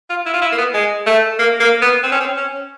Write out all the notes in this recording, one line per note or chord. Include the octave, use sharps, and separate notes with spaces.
F4
E4
F4
E4
A#3
B3
G#3
A3
A#3
A#3
B3
C4
C#4
C4
C#4